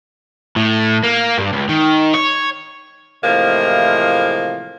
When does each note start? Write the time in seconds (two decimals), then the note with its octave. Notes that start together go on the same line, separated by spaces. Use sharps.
0.56 A2
1.04 A#3
1.38 G2
1.53 C#2
1.69 D#3
2.14 C#5
3.24 A2 C3 E3 F3 G#3 A#3